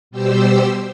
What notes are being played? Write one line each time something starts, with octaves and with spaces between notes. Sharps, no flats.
B2 G3 G4 C5 E6